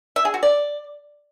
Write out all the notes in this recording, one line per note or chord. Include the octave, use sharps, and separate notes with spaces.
E5
G#4
F#4
D5